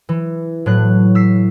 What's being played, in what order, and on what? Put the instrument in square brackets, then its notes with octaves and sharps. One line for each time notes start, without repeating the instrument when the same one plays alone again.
[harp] E3
A2 F#3 F#6
E6 B6 C7